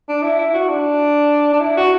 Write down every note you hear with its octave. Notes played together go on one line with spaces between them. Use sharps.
D4
E4
E4
F#4
D4
D4
E4
F#4